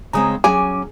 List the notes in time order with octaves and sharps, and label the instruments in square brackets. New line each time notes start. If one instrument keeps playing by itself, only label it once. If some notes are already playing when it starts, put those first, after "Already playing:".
[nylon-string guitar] C#3 G#3 C4 [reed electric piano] A#5 D#6
[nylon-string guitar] F#3 C#4 G#5 [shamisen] G#4 [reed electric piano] D6